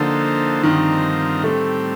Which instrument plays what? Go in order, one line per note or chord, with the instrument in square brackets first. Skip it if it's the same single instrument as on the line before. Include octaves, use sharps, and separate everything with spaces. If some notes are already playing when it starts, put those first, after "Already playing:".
Already playing: [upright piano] D3 [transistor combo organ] F3 A#3 D#4 A4 C5
[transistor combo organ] G2 F3 C4 D#4 A#4 [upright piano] D#3
[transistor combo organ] A2 G3 C4 [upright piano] A3